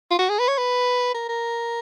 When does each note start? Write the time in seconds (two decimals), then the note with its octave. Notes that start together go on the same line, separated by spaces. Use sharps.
0.11 F4
0.19 F#4
0.30 G#4
0.39 B4
0.49 C#5
0.58 B4
1.15 A#4
1.29 A#4